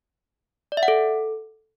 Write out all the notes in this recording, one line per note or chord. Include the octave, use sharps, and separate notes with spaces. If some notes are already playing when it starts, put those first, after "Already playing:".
D5
E5
F#5
A4